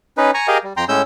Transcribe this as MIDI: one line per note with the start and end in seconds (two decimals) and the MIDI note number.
0.17 0.31 61
0.17 0.31 63
0.17 0.31 71
0.34 0.47 80
0.34 0.47 82
0.34 0.47 85
0.48 0.58 67
0.48 0.58 68
0.48 0.58 70
0.48 0.58 75
0.48 0.58 77
0.64 0.73 55
0.77 0.85 41
0.77 0.85 79
0.77 0.85 82
0.77 0.85 84
0.89 1.02 45
0.89 1.02 56
0.89 1.02 61
0.89 1.02 88
0.89 1.02 91